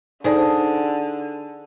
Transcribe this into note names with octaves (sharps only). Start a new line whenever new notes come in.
D3 D#4 G#4 A4 C5 D5 A5